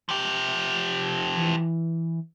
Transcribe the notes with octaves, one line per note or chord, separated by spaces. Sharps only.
F3 G4
E3